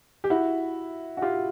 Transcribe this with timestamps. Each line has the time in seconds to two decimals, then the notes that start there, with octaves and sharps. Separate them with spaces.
0.24 G4
0.30 E4 F#4
1.17 F#4
1.22 F4 G4